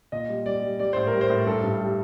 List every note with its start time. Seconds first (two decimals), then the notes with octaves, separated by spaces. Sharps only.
0.12 A#2 D#5
0.29 G3
0.46 G3 D5
0.62 G3
0.79 G3 D5
0.93 A2 C5
1.07 A#4
1.13 G3
1.21 C5
1.30 A2
1.46 G2 A4
1.63 G2
1.81 G3